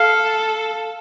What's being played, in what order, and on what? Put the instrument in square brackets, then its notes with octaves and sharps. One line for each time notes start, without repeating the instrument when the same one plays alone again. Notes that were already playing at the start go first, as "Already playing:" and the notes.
Already playing: [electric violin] A4 [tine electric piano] F5